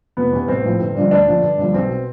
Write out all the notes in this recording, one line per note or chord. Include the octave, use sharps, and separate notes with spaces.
F1 B3
E2 C3
A1 C4
A2 F3
G1
G2 D3 F3
D2 D4
D3 F3
G1
G2 D3 F3
B1 C4
B2